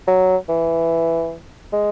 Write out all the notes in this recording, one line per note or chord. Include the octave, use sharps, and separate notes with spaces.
F#3
E3
G#3